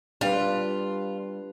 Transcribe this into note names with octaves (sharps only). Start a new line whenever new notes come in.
G3 D4 F4 G4 B4